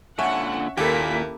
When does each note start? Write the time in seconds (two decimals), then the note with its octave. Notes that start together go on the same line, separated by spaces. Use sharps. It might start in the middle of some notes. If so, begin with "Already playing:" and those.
0.19 A#2 D3 C#4 E5 F#5
0.77 D#2 A#2 A#3 E4 G4 A4 B6